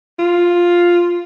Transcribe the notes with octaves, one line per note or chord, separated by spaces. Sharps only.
F4